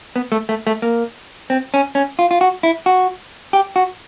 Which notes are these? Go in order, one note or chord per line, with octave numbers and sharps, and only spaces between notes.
B3
A3
A3
A3
A#3
C4
C#4
C#4
F4
F4
F#4
E4
F#4
G4
F#4